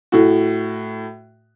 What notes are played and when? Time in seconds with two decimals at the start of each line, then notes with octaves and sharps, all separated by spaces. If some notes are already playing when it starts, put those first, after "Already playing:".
0.12 A2 F#4